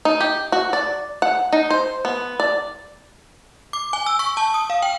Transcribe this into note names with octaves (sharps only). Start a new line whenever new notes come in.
D#4
G4
F#4
D5
F#5
D#4
C5
B3
D5
D6
G#5
E6
C#6
A5
D#6
F5
G5